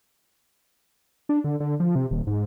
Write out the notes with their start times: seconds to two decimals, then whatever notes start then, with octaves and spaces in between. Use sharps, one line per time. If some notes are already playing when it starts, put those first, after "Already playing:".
1.29 D4
1.44 D3
1.60 D3
1.80 F3
1.95 C3
2.11 D#1
2.27 G#2